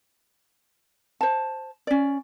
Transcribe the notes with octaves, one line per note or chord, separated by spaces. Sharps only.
C5 A5
C#4 D5